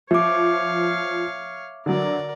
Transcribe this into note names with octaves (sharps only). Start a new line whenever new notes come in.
F3 C#5 E5 F5 D6
D3 F#3 A#4 D5